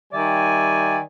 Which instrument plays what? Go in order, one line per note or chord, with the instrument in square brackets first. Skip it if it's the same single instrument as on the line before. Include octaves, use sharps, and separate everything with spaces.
[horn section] D#3 G3 D5 E5 G#5